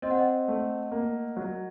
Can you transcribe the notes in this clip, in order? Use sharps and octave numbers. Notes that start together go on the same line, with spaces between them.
C4 D#5
F#5
D#5
A3
A#3
F#3